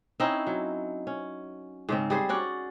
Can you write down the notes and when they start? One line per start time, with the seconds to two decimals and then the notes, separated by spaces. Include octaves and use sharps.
0.20 C4 C#4 D#4 E4
0.47 F#3
1.07 C#4
1.89 G#2 C#3 C4
2.10 G3 G#4 C5
2.29 C#4 F#4 D5